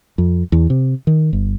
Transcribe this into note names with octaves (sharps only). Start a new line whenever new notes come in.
F2
E2
C3
D#3
G1